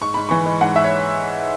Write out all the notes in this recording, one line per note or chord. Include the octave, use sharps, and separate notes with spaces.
G#2 C#6
G#2 B5
E3 C#6
G#3
G#2 F#5
E5
C#5